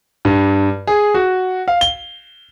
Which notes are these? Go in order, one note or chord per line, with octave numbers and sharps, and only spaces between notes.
G2
G#4
F#4
F5
G7